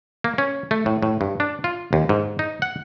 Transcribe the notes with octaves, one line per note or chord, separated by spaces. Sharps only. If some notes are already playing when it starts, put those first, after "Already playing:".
A#3
C#4
A3
A2
A2
G2
D4
F4
D#2
G#2
D#4
F#5